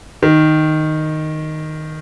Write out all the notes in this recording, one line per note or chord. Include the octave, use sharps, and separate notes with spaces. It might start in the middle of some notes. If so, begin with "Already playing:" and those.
D#3